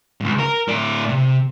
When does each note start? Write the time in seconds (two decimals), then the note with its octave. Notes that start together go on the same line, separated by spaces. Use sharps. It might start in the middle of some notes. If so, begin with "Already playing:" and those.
0.20 C#2 G#2
0.39 A#4
0.68 A2 D5
1.09 C3